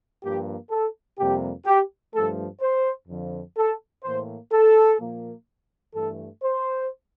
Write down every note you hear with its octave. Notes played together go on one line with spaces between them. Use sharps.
G2 F3 A#3 G4
A4
F2 C3 G3 A#3 G4
G4
G2 F3 A3 A4
C5
F2 D3 F3
A4
A2 E3 A#3 C5
A4
A#2 F3 A#3
G2 E3 A3 A4
C5